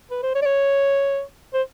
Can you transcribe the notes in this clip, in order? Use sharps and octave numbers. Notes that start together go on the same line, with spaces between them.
B4
C5
C#5
D5
C#5
C5